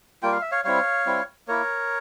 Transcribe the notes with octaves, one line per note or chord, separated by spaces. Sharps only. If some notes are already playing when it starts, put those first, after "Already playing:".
G3 A#3 F4 G5
F5
E5
C#5 F5
G3 C4 E4 C#5 F5
G3 C4 E4
A#3 E4 A#4 C#5